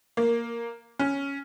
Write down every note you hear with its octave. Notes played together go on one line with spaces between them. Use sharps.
A#3
C#4